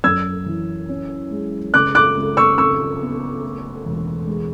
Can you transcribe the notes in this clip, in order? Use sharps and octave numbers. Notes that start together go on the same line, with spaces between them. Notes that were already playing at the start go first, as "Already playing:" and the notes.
F#2 E6 G#6
E3
C#4
G#3
C#2 D6 F#6
D6 F#6
C#2
C#6 E6
C#3 C#6 E6
B3
A3
E1
G#3